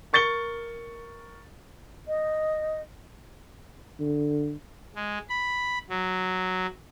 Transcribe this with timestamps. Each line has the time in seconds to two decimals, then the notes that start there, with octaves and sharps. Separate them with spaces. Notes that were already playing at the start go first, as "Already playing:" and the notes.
0.13 A#4 C#6 A6 C#7 G7
2.08 D#5
3.99 D3
4.95 G#3
5.29 B5
5.90 F#3